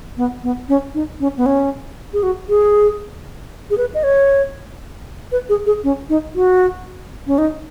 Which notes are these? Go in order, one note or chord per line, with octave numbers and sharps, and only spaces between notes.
B3
B3
C#4
D#4
C#4
B3
C#4
G#4
F#4
G#4
G#4
B4
D#5
C#5
B4
G#4
G#4
C#4
D#4
F#4
C#4
D#4